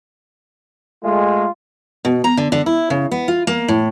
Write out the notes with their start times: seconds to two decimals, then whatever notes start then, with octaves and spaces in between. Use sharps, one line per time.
1.04 G#3 A3 F4
2.05 B2
2.24 A#5
2.37 D3
2.52 D3
2.66 E4
2.90 C#3
3.11 B3
3.28 F4
3.47 A#3
3.68 A2